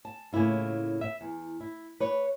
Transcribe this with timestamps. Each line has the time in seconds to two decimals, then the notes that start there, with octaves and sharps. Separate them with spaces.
0.05 A5
0.33 A2 C#3 A#3 E4 F4
1.01 E5
1.21 E2
1.60 E4
2.00 B4 C#5